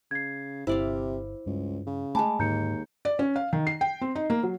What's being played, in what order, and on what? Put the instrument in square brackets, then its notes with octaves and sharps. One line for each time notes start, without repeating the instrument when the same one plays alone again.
[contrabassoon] C#3 [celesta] G#6 C7
[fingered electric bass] G1 [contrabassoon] C3 [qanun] E4 D5 F5 [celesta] C5
[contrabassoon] C#2 [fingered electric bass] G2
[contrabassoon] C#3
[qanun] G#3 D6 [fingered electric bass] A3 [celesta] G#5 A5 B5
[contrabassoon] D#2 [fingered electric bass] G#2 D3 [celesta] A#5 G6 C#7
[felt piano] D5
C#4
F5
D#3
C7
G5
C4
D#4
A#3
F#3